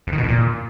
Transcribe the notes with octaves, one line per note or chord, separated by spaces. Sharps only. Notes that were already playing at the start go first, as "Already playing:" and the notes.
F2
D#3
B2
F2
A#2